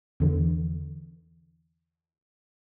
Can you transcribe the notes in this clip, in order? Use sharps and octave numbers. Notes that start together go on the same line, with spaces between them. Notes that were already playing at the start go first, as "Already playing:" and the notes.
E2 D3 E3